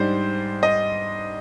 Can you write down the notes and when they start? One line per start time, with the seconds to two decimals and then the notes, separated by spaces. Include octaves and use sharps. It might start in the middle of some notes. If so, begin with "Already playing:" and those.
Already playing: G#2 G3 D4 C5
0.63 D#5